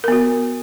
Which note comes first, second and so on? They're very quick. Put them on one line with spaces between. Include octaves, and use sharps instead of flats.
A#4 B3 F#4